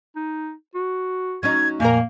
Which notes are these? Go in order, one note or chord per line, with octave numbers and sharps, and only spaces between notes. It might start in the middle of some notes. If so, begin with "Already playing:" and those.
D#4
F#4
F#3 C#4 D#4 G#6
F2 A#2 A#3 A#4 G#5